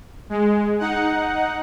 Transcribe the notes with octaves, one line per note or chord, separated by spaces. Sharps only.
G#3
D#4 F#5